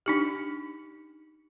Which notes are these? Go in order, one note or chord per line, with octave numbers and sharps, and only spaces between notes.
D4 D#4 G4